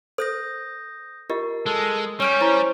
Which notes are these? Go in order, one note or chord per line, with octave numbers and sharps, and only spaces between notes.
A4 C5 D#6 G6 A#6
F4 G4 A#4 D#5
G#3 A4
G3 C#4 C#5 F6 G6
E4 C5 A#5